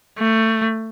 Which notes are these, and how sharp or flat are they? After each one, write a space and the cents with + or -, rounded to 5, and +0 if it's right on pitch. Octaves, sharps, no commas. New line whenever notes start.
A3 +20